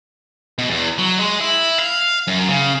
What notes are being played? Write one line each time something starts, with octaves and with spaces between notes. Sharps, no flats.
B2
E2
F#3
G#3
E4
F5
F#2
C#3